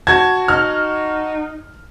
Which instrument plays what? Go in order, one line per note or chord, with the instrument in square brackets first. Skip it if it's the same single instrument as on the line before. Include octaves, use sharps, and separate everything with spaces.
[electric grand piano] F#4 A5 [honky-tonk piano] G#6
[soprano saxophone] D#4 [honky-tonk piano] F6